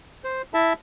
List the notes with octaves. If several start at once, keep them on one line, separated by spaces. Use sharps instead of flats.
C5
E4 E5 A5